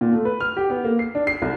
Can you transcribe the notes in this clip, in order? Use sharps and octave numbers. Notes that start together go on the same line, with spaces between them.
A#2
A3
B4
F6
G4
B3
A#3
C7
D4
C7
C2